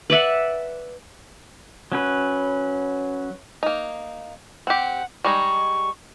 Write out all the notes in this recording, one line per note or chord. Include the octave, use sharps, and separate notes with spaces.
B4 D5 E5 F#5
F#3 C#4 B4
A#3 D#4
C4 G4 F#5
G3 G#3 D#4 C#6